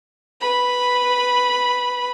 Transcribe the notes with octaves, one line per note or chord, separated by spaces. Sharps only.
B4 B5